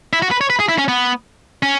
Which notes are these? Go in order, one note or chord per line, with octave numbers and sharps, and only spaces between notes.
E4
F#4
B4
C#5
B4
G#4
E4
C#4
B3
C#4